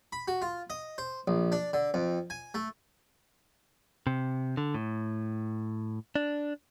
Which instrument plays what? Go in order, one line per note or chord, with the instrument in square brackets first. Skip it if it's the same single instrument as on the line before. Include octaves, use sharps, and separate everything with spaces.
[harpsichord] B5
F#4
F4
D#5
C5
A#1
D4
D3
F2
G#5
A3
[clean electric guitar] C3
D3
A2
D4